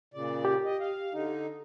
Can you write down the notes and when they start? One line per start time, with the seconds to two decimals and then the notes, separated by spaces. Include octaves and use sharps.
0.14 A#2 C#3 D5
0.45 G4
0.65 D#5
0.80 F5
1.13 D3 D#4